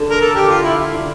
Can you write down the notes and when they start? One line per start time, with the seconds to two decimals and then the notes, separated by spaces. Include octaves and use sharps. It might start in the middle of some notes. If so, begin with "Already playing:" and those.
Already playing: D3
0.10 A#4
0.21 A4
0.35 G4
0.48 F4
0.63 E4